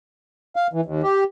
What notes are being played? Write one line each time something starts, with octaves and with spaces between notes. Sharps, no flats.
F5
E3
D#2
G4